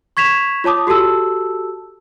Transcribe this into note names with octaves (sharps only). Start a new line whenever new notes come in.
C#6 G#6 B6 E7 F7
F4 C#5 A5 D6 D#6
F#4 G4 A4 A5 E6